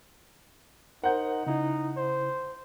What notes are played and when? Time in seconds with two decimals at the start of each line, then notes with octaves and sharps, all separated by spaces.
1.04 D#4 A#4 C5 F#5 G6
1.47 C#3 D#4 E4
1.97 C5